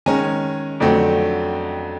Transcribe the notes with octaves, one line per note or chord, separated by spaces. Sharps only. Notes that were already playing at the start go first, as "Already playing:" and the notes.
D#3 G#3 C#4 G#5 A#5
F2 D3 F#3 A3 C4